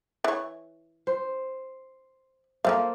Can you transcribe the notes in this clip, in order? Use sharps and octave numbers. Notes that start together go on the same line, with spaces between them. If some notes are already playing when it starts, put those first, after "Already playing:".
E3 C#5
C5
F3 A3 A#3 A4 C5 F5